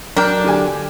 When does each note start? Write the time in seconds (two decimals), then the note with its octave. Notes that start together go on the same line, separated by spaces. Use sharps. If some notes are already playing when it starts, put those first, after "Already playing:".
0.17 F#3 D4 A#4 G5
0.44 D3 G4 G#5